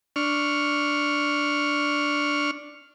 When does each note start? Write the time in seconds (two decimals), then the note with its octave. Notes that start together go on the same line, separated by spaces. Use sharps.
0.16 D4 C#6 F6